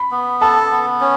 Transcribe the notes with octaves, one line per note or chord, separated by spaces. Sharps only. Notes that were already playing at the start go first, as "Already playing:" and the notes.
Already playing: B5
B3
A4 A5
B3
C#4